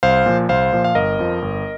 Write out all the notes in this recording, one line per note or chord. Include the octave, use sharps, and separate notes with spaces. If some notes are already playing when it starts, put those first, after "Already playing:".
C2 C5 F5
A#2 F3
C2 C5 F5
A#2 F3
F5
G1 A#4 D#5
F2 F3
G1